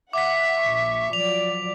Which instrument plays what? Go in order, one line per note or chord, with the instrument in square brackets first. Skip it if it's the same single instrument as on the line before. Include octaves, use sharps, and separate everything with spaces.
[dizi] E5 [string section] F#5 [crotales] D6 B6
[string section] A#1 C#6
[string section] F3 F#3 D5 [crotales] F7